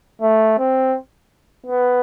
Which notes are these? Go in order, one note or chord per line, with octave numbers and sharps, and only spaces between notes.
A3
C4
B3